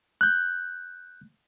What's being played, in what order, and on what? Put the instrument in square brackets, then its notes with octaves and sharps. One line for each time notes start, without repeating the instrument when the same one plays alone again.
[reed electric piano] F#6 G6